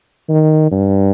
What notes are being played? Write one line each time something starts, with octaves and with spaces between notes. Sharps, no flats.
D#3
G2